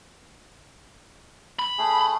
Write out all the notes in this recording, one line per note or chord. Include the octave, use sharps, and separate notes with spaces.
B5
A3 C#4 G#4